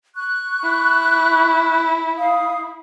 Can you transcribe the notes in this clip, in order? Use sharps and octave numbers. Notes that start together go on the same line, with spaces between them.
C#6 F#6
E4
F5 D#6